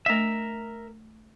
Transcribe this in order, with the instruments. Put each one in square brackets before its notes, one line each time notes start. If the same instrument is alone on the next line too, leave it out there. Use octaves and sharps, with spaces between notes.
[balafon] A3 D4 D#5 [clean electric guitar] A#4 E5